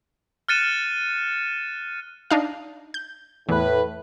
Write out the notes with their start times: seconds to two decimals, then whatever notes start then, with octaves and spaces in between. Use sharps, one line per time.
0.49 F6 F#6 A6 C#7 D#7 E7
2.31 D4 D#4 F5
2.94 G6
3.49 E2 A2 B4